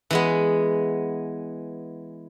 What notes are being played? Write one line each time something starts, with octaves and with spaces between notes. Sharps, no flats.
E3 G#3 B3